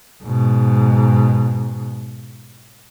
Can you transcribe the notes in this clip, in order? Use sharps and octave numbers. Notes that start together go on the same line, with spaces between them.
G#2 B2